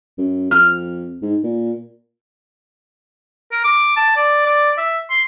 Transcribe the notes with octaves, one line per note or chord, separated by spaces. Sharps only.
F#2
F2 F6
G#2
A#2
A#4
D6
A5
D5
D5
E5
C6